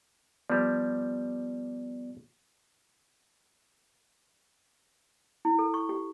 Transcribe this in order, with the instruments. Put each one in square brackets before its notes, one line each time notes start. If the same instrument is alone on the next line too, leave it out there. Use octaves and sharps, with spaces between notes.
[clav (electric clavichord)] F3 G3 [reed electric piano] B3 D5
[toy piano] E4
A4
C#6
G4